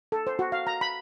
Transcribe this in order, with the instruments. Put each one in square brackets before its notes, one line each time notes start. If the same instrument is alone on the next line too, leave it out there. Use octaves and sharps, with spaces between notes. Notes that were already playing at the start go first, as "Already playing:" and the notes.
[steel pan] A4
C5
F#4
F5
A#5
B5